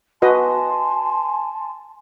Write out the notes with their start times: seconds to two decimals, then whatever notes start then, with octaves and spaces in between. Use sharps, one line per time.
0.22 F#4 B4 D#5 G#5 A5 C6